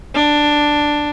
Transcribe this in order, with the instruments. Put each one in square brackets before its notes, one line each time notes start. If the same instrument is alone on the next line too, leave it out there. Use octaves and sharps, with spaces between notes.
[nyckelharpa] D4